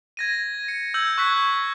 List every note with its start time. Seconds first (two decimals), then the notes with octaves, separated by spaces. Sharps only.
0.17 G#6 A#6 D#7
0.68 C#7
0.94 E6 G6 G#6 F#7
1.18 C#6 F#6 G#6 B6